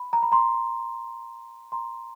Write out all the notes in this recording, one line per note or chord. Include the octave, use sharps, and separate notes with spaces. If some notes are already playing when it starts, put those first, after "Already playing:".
Already playing: B5
A#5
B5
A#5 C6
A#5 C6